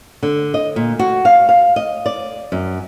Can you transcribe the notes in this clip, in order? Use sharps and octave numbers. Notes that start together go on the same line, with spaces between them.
D3
D#5
A#2
F#4
F5
F5
D#5
D5
F#2